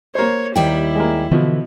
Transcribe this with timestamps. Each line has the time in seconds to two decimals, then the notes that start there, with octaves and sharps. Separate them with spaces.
0.15 A#3 C5 C#5
0.56 D#2 G3 E4 G5
0.95 G#3 A#3
1.31 B2 D3 E3 F3